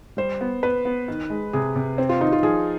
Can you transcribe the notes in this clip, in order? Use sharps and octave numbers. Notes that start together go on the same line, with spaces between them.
G3 C5
B3
B3 B4
B3
D#3
G#3
C3 G#4
C3
C4
F4
D#3 D#4
F4
F3 G#4